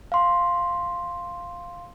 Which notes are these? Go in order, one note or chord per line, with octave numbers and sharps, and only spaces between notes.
F5 C6